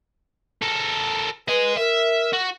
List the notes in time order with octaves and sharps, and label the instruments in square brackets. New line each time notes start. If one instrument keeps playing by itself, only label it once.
[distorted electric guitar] A4 A#4
[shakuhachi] B4 [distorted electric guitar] D#5 G#5
[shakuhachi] A#4 [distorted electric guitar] E5
[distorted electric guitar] F#4